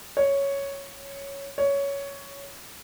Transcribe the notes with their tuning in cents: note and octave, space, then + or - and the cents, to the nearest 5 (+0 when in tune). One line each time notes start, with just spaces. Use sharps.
C#5 +0
C#5 +10